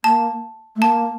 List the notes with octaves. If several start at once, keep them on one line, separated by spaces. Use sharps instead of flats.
A#3 A5
A3
A#3 A5